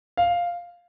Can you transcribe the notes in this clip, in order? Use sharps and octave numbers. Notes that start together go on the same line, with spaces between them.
F5